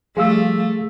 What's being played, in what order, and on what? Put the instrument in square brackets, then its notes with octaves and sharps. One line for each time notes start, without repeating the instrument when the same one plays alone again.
[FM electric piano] F3 G3 [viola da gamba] A3 [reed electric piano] G#4 F5 E6